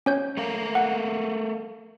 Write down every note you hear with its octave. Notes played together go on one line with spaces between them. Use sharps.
C#4 C#5 G6
A3 A#4 F5
F#5